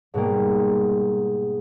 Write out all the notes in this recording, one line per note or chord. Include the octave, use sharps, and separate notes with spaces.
G#2 B2 G3 A#3